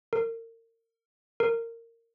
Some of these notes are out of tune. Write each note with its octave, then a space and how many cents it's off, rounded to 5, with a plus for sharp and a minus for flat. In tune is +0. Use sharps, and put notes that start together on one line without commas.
A#4 -35
A#4 -20